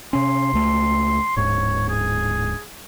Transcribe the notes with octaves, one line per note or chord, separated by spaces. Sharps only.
C3 C#4 C6
C#2 A3
D1 G#2 C#5
G#4